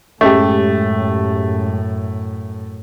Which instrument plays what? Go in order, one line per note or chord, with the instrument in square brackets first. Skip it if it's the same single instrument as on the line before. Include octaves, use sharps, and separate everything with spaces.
[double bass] F#2 A2 [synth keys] G#3 C#4 G4 [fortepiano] A3